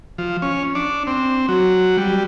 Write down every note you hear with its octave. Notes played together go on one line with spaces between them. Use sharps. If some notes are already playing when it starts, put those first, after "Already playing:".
F3
C#4
D4
C4
F#3
G3